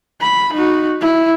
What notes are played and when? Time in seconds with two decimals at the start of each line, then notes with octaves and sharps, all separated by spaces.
0.21 B5
0.53 D#4 F#4
1.01 E4